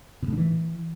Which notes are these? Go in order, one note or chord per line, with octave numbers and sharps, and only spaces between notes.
B2
A2
D3
E3